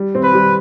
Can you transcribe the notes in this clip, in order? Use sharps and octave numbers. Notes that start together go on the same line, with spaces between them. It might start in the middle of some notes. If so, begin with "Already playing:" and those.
Already playing: G3
C4
B4
G3